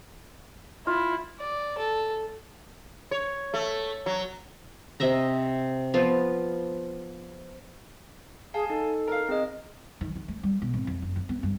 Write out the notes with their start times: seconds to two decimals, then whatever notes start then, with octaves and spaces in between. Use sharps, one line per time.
0.87 E4 F4
1.40 D5
1.78 A4
3.11 C#5
3.54 A3
4.06 F#3
5.00 C3 D#5 E5 A#5
5.94 F3 B3 F4
8.54 G#4 F5 G#5 A5
8.70 D#4 A4
9.08 A#4 F5
9.29 C4 G#4 D#5
10.01 D#3
10.16 D#3
10.28 A3
10.43 G3
10.62 B2
10.74 G#1
10.87 F2
11.02 F#1
11.16 F2
11.29 B3
11.43 G2